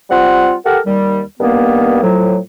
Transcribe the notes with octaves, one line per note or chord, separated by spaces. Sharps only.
G3 C4 F4 F#5
G4 A4 A#4 F#5
D#2 G3
G2 D#3 A#3 B3
A2 F3 F#3